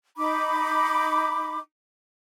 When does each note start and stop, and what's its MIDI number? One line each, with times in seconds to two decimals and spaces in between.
0.18 1.59 63
0.18 1.59 83
0.18 1.59 86